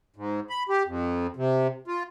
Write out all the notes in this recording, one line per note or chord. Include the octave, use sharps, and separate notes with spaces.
G#2
B5
G4
F2
C3
F4